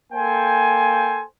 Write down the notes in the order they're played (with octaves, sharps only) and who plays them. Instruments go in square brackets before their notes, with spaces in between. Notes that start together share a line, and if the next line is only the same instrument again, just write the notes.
[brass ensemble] A#3 A4 C5 G5 G#5